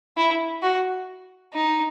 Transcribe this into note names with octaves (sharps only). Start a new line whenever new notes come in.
E4
F#4
D#4